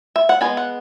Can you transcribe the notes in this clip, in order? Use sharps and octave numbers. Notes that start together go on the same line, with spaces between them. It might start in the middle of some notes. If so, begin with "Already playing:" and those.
E5
F#5
G#3 B3 D4 G#5
F#5